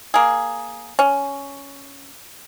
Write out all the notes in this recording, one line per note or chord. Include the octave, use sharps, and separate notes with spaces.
A#3 G#4
C#4